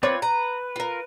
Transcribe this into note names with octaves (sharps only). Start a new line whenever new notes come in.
C4 F4 B4 C#5 D5
B4 A#5
F4 A#4